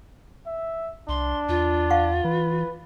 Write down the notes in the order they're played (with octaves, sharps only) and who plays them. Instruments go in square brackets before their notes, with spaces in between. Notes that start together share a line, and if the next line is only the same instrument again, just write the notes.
[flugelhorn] E5
[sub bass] C2 [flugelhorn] D4 [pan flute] C6
[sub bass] E2 [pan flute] F4
[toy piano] F5 F#5 C#6
[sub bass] E3 [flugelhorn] B4